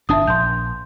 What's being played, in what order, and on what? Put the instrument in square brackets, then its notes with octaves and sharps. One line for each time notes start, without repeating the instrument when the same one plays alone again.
[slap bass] G1 D4 [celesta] E5 A5 D#6
[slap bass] A#1 [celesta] C6 G6